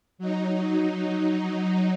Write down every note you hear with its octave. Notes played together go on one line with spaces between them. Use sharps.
F#3 D#4